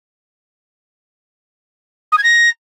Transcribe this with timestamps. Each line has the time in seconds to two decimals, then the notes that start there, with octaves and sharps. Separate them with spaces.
2.12 D#6
2.17 G#6
2.23 A#6